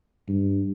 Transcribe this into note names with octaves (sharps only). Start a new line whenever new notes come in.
G2